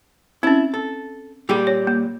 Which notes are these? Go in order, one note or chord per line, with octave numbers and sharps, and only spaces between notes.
C4 C#4 E4
A4
A#2 G3 G4 G#4 G5
C#5
A#3